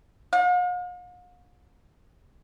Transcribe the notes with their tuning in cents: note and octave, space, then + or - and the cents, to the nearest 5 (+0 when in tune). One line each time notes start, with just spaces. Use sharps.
F5 +45